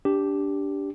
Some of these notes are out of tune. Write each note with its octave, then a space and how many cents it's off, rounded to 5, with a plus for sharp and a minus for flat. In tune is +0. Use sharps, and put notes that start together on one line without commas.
D4 -20 G4 +0